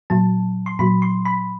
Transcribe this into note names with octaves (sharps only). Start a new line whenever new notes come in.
A#2 F#3 A5
C6
A#2 F#3 B5
C6
B5